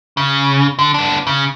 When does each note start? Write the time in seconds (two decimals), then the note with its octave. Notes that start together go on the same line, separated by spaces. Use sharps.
0.17 C#3
0.79 D3
0.94 B3 D4
1.27 C#3